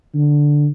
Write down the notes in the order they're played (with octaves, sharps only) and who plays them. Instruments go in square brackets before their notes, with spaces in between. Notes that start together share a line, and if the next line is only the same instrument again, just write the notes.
[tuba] D3